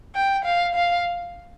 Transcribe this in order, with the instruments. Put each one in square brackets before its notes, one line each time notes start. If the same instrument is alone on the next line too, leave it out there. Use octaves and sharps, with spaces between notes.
[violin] G5
F5
F5